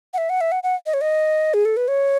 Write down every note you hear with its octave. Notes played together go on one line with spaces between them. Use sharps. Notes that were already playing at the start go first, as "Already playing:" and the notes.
F#5
E5
F#5
E5
F#5
F#5
D#5
C#5
D#5
G#4
A4
B4
C#5